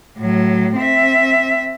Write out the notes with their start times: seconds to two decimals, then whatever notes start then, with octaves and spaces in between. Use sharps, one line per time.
0.19 A2 F#3
0.76 C4 E5